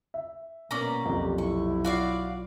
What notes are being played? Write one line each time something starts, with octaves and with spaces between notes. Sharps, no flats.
E5
B2 A#3 C#4 D5 A#5
B1 F2 C3
E4 C#6
F4 F#4 D5 F5